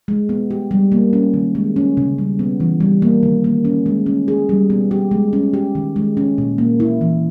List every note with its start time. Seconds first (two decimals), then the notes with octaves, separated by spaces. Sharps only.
0.08 G#3
0.29 B3
0.51 G4
0.71 G3
0.92 A#3
1.13 C#4
1.34 D#3
1.55 G#3
1.76 C#4
1.97 C#3
2.18 G3
2.39 B3
2.60 E3
2.80 G3
3.02 A#3
3.23 D#3
3.44 A#3
3.65 C#4
3.86 G#3
4.06 C#4
4.28 G#4
4.49 G3
4.70 B3
4.91 G4
5.11 G#3
5.33 C#4
5.54 G4
5.75 D#3
5.96 G#3
6.17 C#4
6.38 A#2
6.58 A#3
6.80 E4
7.01 E3